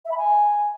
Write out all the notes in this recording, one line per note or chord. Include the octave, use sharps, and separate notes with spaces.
E5
B5
G#5